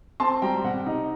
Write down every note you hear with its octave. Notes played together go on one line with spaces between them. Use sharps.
C4 A5 C6
G3 G5 A#5
C3 F#5
D#4